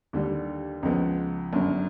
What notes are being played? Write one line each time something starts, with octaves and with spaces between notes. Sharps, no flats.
D#2 D3 G3
C#2 C#3 F3 G#3 B3
G1 F#2 D3